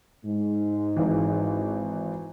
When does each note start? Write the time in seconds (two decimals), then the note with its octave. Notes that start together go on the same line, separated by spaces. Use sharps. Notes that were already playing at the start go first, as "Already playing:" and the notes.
0.26 G#2 G#3
0.96 G#1 E3